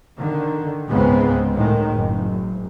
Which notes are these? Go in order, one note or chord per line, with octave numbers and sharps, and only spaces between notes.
D3 D#3
C#2 G#2 C#3 G#3 B3 C4
A2 D#3 G#3
F#1